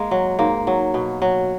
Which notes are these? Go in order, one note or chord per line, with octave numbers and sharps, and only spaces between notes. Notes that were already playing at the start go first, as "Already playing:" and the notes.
Already playing: G#3 A#3
F#3
G#2 A#3
F#3
B2
F#3